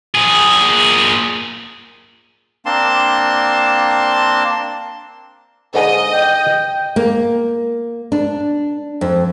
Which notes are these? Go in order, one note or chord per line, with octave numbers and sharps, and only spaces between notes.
A#2 G#4
A#3 C4 D4 A5 C6
G#2 D3 D#5
G5
A#3
D4
F2